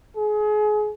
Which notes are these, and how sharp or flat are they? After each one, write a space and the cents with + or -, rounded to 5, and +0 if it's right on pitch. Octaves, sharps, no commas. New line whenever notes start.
G#4 +30